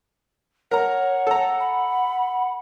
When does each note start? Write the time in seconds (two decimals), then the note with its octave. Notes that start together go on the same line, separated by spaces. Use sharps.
0.71 A#4 C#5 F#5 A#5
1.27 A4 A#5
1.60 B5